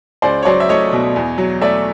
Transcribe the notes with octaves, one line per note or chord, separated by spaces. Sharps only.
C#2 C5 D5
C#5
F#3 C5 D5
E5
A3 C#5 D#5
B2
E2
F#3
A3 D5 E5